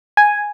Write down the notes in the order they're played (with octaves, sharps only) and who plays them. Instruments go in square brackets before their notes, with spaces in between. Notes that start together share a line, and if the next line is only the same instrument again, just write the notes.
[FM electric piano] G#5